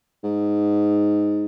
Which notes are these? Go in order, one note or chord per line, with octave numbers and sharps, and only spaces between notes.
G#2